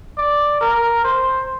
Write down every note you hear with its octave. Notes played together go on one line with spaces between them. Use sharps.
D5
A#4
C5